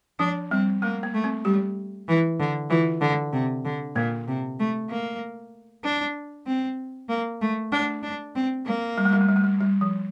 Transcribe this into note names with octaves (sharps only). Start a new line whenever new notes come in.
F3 D4
G3 C4
A3 A#3
A#3
A3
C4
G3 G4
E3
D3
E3 F4
D3
C3
D3
A#2 A#3
C3
A3
A#3
D4
C4
A#3
A3
A3 D4
D4
C4
A#3
G3
A3
G3
A3
G3
A3
G3
G3
F3